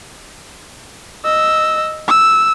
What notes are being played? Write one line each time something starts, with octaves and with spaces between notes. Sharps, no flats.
D#5 E6
E6